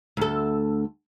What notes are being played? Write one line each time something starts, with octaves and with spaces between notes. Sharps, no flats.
D2 A4